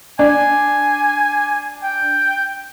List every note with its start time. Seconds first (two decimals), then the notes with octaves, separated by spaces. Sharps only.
0.19 D4 G#5
1.83 G5